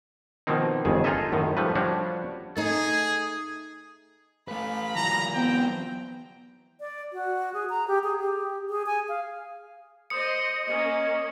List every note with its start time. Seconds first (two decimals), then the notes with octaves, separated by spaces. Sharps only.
0.47 B2 D#3 F3 A#3 C4 D#4
0.85 G1 F2 D#3 G#4
1.04 D#4 F4 G#4 A4 D#5 E5
1.32 F#2 A2 D#3
1.57 F3 G3 A3 B4
1.75 F3 G3 D4 F#4 C#5
2.57 A3 D#4 G#4
4.48 A3 B4 F5 B5
4.96 E3 F#3 A#5
5.34 B3 C4 G5
6.80 D5
7.13 F#4
7.54 G#4
7.69 A#5
7.88 G4
8.04 G#4
8.20 G4
8.69 G#4
8.86 G#5
9.09 F5
10.10 C5 D#5 D#6 C#7
10.67 A#3 C#4 D#5